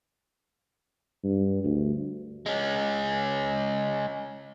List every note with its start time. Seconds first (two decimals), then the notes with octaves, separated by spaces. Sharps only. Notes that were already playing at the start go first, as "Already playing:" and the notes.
1.24 G2
1.64 D2
2.46 G#3 C#4